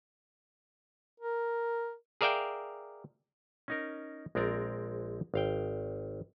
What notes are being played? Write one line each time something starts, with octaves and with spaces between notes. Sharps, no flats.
A#4
G#4 A#4 D5 E5 F5 G5
C#4 D#4 A#4
A#1 G#3 C4 A#4 D5 A#5
G#1 F5 G5